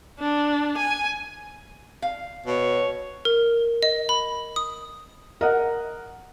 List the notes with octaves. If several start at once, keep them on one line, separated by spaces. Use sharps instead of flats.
D4
G#5
F5
B2 C#5
A#4
D#5
B5
D#6
A#4 D#5 F#5